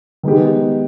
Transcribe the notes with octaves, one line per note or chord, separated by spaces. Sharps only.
D#3 G#3 B3 D#4 G4